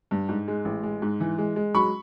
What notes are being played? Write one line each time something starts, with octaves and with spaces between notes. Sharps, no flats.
G2
G#2
G#3
A1
G#3
G#2
E3
G#3
G#3
F#3 B5 C#6